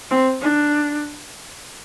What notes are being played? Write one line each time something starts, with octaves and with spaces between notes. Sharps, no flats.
C4
D4